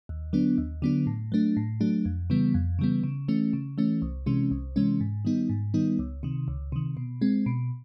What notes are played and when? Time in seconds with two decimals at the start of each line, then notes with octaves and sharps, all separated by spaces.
0.09 D#2
0.33 D3 F#3 B3 D4
0.58 D#2
0.82 D3 F#3 B3 D4
1.07 A2
1.32 F#3 A3 D4
1.57 A2
1.81 F#3 A3 D4
2.05 F2
2.30 C#3 E3 G3 B3
2.54 F2
2.79 C#3 E3 G3 B3
3.03 C#3
3.28 E3 A3 C#4
3.53 C#3
3.78 E3 A3 C#4
4.02 C2
4.26 C3 E3 G#3 C#4
4.51 C2
4.76 C3 E3 G#3 C#4
5.00 G#2
5.25 D#3 G3 B3 D#4
5.50 G#2
5.74 D#3 G3 B3 D#4
5.99 C#2
6.23 C3 D#3
6.48 C#2
6.72 C3 D#3
6.97 B2
7.21 G#3 C4
7.46 B2